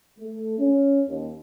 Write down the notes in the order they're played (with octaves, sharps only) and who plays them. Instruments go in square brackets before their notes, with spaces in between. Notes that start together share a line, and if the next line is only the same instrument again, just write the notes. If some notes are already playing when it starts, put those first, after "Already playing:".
[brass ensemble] A3
C#4
D#2